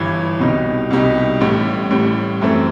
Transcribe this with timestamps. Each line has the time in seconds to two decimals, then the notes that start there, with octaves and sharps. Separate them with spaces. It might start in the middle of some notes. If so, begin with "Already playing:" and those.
Already playing: G1 G2 E3
0.40 C2 B2 G3 D#4
0.91 C2 B2 G3 D#4
1.41 A1 A2 G3
1.90 A1 A2 G3
2.41 F#2 E3 A3 C4